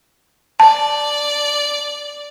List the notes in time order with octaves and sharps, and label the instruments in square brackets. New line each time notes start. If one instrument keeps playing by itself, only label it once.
[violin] D5 [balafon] A5